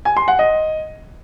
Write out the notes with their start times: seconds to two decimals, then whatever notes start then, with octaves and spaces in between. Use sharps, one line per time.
0.05 G#5
0.17 C6
0.28 F#5
0.39 D#5